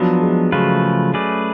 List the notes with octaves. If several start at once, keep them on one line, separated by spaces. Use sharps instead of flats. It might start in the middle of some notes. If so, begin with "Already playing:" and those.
Already playing: F3 F#3 B3 D4
G#3
C#3 F3 F#3 A3 F4 B4
A3 C#4 G#4 B4 D5